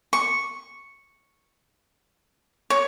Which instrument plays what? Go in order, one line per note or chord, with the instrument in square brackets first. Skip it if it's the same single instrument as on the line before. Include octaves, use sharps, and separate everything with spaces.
[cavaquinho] C#6
C#5